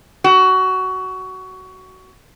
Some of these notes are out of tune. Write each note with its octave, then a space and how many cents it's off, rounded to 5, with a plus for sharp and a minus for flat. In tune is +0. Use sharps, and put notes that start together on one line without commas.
F#4 +15